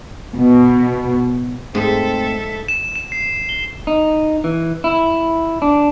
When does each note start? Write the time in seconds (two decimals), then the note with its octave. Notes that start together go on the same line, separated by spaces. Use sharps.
0.35 B2
1.75 G#2 A3 C4 A4 E5
2.68 E7
2.96 E7
3.12 C7
3.49 G7
3.87 D#4
4.44 E3
4.84 E4
5.62 D4